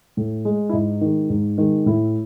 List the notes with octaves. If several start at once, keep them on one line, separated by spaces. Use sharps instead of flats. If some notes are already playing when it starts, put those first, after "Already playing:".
A2
G#3
E4
G#2 D#4
D#3 G#3
G#2
D#3 G#3
A2 E4